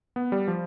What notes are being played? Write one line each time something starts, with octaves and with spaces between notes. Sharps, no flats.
B3
G3
F3